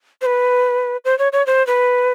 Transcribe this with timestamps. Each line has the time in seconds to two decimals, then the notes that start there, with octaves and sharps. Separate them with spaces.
0.21 C5
0.26 B4
1.05 C5
1.18 C#5
1.32 C#5
1.46 C5
1.67 B4